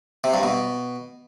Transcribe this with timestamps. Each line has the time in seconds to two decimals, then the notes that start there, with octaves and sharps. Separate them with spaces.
0.24 C3
0.34 G2
0.43 B2